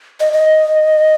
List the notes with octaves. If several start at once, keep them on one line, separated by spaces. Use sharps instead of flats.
D#5
D#5